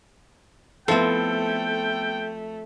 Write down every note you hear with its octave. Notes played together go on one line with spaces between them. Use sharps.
F3 A3 B3 C4 E4 A4 G5